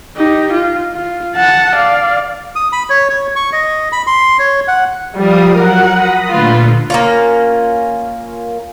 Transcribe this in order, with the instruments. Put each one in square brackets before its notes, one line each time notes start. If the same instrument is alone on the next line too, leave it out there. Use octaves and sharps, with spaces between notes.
[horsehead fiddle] D#4 G4
F4
F4
F#5 A5
D5 F5
[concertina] D#6
B5
C#5
C#5
C#6
D#5
B5
C6
C#5
F#5
[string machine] F3 F5 D#6 [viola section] G3
[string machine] F#3 [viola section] A#4 F#5
[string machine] B5 D#6 A#6
[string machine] A#2 D3 A3 [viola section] F4 B4
[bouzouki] A#3 C#4 F4